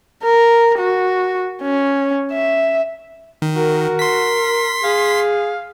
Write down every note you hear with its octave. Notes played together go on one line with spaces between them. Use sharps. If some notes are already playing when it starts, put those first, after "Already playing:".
A#4
F#4
C#4
E5
D#3
F#4 A#4
C6 B6
G#4 F5